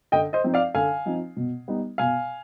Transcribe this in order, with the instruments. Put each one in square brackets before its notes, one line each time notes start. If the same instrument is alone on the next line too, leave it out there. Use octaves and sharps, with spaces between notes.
[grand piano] D3 D#5 G5
C5 D#5
F3 C4 D#4
D5 F5
D3 F5 G#5
F3 C4 D#4
B2
G3 B3 D#4
B2 F5 G#5